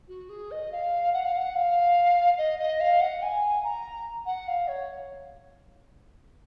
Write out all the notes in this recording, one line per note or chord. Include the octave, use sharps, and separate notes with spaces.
F#4
G#4
D#5
F5
F#5
F5
F#5
F5
D#5
D#5
F5
F#5
G#5
A#5
F#5
F5
C#5